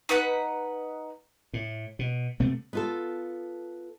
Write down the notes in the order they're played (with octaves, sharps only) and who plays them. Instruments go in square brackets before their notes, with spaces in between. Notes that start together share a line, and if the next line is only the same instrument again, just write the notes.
[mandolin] D#4 B4 F#5 F#6
[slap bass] A2
B2
C3 A3 B3 C4
[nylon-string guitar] B3 F4 A4